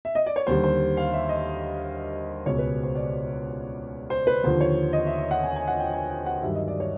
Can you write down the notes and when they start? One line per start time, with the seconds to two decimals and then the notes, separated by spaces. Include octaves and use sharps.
0.05 E5
0.15 D#5
0.26 D5
0.36 C#5
0.47 D#2 D3 G3 C5
0.64 C5
0.97 F5
1.13 E5
1.29 D#5
2.46 C#2 B2 G#3 C#5
2.58 B4
2.83 C5
2.95 D5
4.10 C5
4.27 B4
4.43 D#2 D3 F3 C5
4.61 C#5
4.93 D#5
5.06 E5
5.31 F#5
5.43 G#5
5.56 G#5
5.68 F#5
5.80 G5
5.93 G#5
6.10 G5
6.26 F#5
6.42 G2 D#3 F#3 E5
6.55 D#5
6.68 D5
6.80 C#5